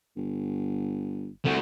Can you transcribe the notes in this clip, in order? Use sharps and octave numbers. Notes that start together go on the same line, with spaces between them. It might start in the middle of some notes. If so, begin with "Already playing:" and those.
G1
C2 A3 F#4